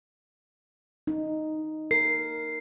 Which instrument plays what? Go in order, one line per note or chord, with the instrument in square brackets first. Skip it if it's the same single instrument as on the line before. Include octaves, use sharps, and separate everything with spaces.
[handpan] D#4
[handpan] A#4 [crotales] C7